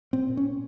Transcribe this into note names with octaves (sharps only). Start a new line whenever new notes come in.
A#2 C4
A#2
C#4
A#2